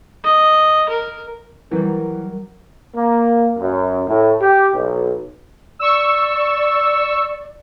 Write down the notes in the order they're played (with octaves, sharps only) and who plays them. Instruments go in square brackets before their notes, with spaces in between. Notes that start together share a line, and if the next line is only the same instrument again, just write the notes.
[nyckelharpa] D#5
A#4
[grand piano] E3 [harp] F#3 G3 [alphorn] A#4
[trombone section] A#3
F#2
A2
G4
B1
[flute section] D5 [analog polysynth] C#6 E6